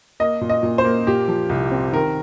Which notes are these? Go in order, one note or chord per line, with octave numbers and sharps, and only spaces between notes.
A#3 D#5
A#2
D#5
A#2
C5
A#3
A#2 G4
F3
C2
C4
D#3 A#4